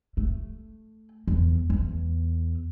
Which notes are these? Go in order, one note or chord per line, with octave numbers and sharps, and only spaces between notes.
A3
E2
E2